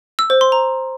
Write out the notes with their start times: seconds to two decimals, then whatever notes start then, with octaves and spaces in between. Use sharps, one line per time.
0.19 E6
0.30 C5
0.41 C6
0.52 A#5